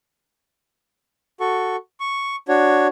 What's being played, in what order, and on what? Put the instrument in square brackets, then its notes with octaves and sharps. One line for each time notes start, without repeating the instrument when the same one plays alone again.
[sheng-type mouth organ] F#4 A4 C#6
C#6
D4 F#4 C#5